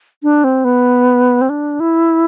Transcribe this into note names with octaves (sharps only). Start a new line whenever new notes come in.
D4
C4
B3
C4
D4
E4